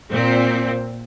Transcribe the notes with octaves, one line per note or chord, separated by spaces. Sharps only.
A#2 C4